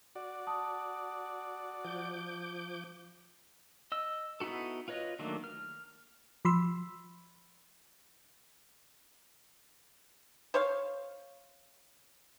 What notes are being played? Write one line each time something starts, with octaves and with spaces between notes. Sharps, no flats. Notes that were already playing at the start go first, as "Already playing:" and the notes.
F#4 D5
A5 D#6
F3 D6 G6
D#5 E6
B3 D#4 E4 F#4 A4
F4 B4 C#5 D#5
D#3 F#3 A3 A#3 D4
F6
F3 B5 C6 E6
C5 C#5 F5